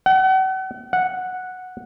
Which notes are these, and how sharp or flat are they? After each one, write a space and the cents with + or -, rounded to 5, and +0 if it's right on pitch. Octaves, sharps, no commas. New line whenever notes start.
F#5 +40
F#5 -5